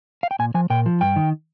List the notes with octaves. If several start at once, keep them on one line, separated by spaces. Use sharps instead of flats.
F5
G5
A#2 G#5
F3 G#5
A#2 G5
F3
G2 G5
D#3